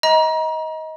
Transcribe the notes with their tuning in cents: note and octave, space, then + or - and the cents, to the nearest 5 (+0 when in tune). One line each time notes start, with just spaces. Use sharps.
D#5 +20 A#5 +35